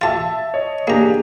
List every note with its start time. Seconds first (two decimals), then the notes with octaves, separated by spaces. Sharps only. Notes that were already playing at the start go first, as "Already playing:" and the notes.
0.01 F4 G4 E5 A5 A6
0.54 C#5 D#5
0.87 A#3 D4 G4 G#4 A#5